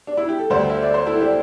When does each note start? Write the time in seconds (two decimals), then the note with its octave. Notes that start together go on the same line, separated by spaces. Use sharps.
0.07 D4
0.17 E4
0.29 G4
0.39 A4
0.50 D2 D3 G3 G4 C5
0.70 E5
0.82 D5
0.94 C5
1.06 E4 A4
1.20 D4 G4